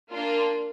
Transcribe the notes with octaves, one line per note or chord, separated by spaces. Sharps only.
A#3 D4 F4